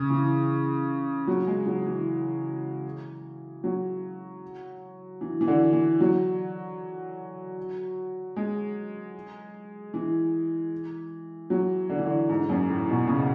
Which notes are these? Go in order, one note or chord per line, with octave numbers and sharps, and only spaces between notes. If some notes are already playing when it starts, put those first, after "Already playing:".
Already playing: C#3
E3
F#3
G#3
F#3
E3
F#3
E3
E3
D3
E3
F#3
G#3
E3
F#3
D3
E3
D3
G#2
F#2
A2
B2
C#3